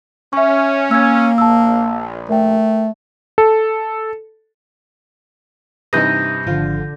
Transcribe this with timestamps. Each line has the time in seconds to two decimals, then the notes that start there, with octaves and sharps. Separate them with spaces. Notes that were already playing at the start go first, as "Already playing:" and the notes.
0.33 C#4 E5 C#6
0.91 A#3 E6 G#6
1.38 A#1 A5 E6
2.30 A3 A#4 G5
3.38 A4
5.93 G2 C3 E3 D#4 D#6 G6 A#6
6.47 G#1 D3 F3 F4